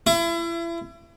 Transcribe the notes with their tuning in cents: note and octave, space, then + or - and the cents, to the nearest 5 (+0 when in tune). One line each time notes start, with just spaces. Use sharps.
E4 +35